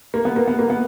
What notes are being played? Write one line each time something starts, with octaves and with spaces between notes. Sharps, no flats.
A#3
B3
A#3
B3
A#3
B3